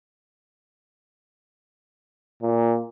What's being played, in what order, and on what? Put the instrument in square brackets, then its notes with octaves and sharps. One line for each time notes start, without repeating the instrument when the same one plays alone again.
[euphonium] A#2